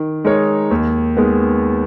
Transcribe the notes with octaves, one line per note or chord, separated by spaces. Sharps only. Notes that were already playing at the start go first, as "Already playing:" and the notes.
Already playing: D#3
G#3 D#4 A#4 C#5
D#2
D#3 G#3 B3